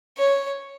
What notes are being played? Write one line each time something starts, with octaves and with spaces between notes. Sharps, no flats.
C#5